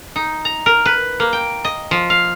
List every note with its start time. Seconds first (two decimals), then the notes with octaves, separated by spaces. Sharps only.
0.16 D#4
0.45 A#5
0.66 A#4
0.85 B4
1.20 A#3
1.33 G5
1.65 D#5
1.91 F3
2.10 F5